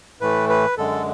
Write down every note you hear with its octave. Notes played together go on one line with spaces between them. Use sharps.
A2 E3 A3 B4
B4
F#2 D3 G#3 A4